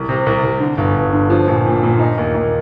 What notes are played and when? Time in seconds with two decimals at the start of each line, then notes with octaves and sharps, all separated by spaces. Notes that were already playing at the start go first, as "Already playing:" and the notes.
Already playing: C2
0.09 C3
0.26 C2
0.43 C2
0.60 D3
0.77 G1
0.95 G1
1.12 D3
1.30 F3
1.48 A#1
1.66 A#2
1.83 A#2
1.99 D#4
2.18 D#2
2.35 D#2